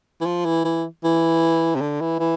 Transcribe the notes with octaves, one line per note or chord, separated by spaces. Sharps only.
E3
F3
E3
E3
E3
C3
D3
E3
E3